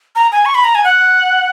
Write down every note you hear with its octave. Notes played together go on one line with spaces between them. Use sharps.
A#5
G#5
C#6
B5
A#5
G#5
F#5